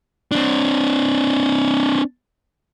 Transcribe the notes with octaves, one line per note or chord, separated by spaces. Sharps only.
C4 D4